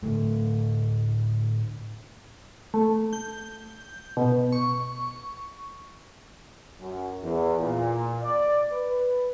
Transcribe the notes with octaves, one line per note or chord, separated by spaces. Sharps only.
A2 D3 A3
A3
G6
B2
C#6
F#2
E2
A#2
D5
B4